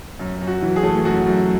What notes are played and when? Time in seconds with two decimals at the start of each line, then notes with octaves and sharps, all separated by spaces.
0.19 F#2
0.41 F#2
0.47 F#4
0.62 E3
0.76 G#4
0.83 A3
1.05 F#2 F#4
1.26 F#2